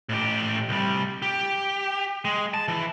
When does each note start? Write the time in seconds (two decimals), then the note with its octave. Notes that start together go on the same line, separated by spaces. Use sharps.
0.09 A2 G4
0.69 C2 G3
1.22 G4
2.25 G#3
2.54 A5
2.68 E3